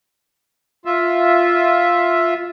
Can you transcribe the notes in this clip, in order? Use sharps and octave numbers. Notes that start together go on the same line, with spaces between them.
F4 E5